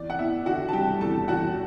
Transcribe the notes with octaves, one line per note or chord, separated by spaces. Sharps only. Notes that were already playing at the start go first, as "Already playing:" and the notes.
Already playing: E2 D5
F#5
B3 E4 E5
D3 F#4 F#5
A5
G3 G4 G5
E2 A4 A5
E2 F#4 F#5